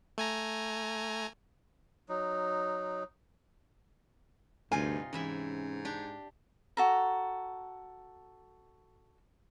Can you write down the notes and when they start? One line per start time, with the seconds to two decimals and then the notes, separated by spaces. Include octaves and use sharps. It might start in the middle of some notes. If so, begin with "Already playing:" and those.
0.18 A3 G#5 A#5
2.09 F#3 D#4
4.72 D2 G2 C3 D#4 F4 G#5
5.13 G#2 E3 C#4 E4 E5
5.85 D4 G4
6.77 F#4 A4 A#5